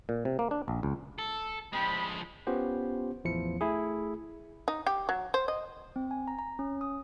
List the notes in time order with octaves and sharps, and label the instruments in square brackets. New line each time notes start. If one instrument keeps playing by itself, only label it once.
[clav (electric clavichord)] A#2
C3
A#3
D4
A#1
C#2
[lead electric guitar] A4
[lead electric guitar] F3 G#3 [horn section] C4 G5 B5
[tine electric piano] B3 C#4 F4 G4 C5
A1 E2 F3 E4 C#7
A3 E4 G#4
[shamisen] D#4
G4
F#3
C5
D#5
[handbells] C4
G#5
A#5
A#5
C#4
D#6